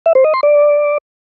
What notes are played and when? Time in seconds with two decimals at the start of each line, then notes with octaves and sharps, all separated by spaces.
0.06 E5
0.15 C5
0.24 D#5
0.34 C6
0.43 D5